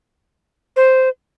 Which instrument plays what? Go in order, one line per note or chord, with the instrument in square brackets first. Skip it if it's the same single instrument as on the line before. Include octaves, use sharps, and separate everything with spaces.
[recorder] C5